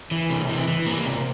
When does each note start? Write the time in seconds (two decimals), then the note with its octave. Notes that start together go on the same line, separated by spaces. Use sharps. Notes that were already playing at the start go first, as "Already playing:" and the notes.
0.11 E3
0.30 C3
0.49 E3
0.68 E3
0.86 A#3
1.06 C3